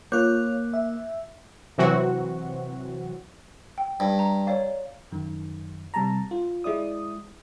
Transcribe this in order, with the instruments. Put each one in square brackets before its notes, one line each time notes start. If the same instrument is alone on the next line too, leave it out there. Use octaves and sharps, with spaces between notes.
[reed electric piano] A#3 [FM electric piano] F4 C#5 [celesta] D6 F#6 G6
[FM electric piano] E5
[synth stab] C3 E3 F#3 C4 F#4
[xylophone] G5
[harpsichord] G2
[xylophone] A#5
C#5 D5 F5
[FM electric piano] F#2 D#3
C3 G3 A5 A#5
F4
G#3 E4 D5 D#6